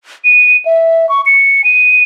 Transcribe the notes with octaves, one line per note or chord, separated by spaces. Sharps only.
D#7
E5
C#6
C#7
D#7